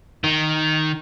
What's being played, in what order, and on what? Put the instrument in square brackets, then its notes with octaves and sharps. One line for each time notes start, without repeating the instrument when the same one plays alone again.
[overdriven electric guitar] D#3